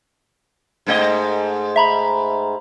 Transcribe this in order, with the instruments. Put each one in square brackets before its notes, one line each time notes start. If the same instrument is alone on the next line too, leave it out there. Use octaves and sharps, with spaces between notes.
[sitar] G#2 A3 D#5
[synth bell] E5 A#5 B5